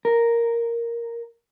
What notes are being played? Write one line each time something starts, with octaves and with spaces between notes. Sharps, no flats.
A#4